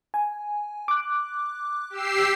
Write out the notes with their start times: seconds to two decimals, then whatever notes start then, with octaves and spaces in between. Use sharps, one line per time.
0.14 G#5
0.88 D6 F#6
1.90 G4 E6 C7